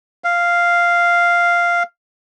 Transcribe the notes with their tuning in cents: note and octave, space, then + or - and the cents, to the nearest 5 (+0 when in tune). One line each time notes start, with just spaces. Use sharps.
F5 -5